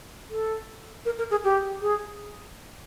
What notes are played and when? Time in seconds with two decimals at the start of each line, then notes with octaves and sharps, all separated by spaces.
0.30 A4
1.05 A#4
1.18 A#4
1.31 G#4
1.44 G4
1.82 G#4